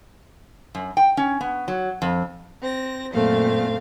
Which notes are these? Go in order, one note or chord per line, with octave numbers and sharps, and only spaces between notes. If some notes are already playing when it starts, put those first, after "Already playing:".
F#2
G5
C#4
B3
F#3
F2
C4 A#6
F#2 A#2 A3 C4 F5